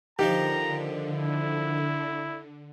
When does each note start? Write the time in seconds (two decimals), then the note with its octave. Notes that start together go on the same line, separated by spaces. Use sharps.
0.19 D3 D#3 F3 G4 A#5
1.10 E4